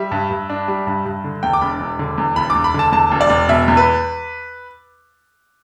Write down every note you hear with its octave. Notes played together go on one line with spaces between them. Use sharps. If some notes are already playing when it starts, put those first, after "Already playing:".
Already playing: G3 E5
G2
G2
D4
G3
G2
G2
D3
E2 G5
D6
E1 B5
E1
D3
E2
E1 B5
E1 D6
B5
D3 A5
E2 A5
E1
D5
E1
B2 E5
E2
B4